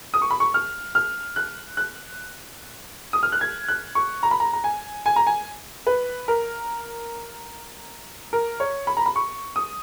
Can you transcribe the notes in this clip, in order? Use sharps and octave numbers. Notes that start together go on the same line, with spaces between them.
D#6
C#6
B5
C#6
F6
F6
F#6
F#6
D#6
F6
F#6
G#6
F#6
C#6
A#5
B5
A#5
A#5
G#5
G#5
A#5
G#5
B4
A#4
A#4
C#5
B5
A#5
B5
C#6
D#6